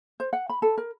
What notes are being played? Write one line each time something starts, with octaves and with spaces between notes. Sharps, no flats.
C5
F#5
B5
A4
A#4